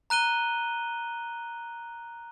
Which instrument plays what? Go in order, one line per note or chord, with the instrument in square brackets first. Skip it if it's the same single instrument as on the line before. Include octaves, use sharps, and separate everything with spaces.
[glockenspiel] A#5 F#6 D#7 G7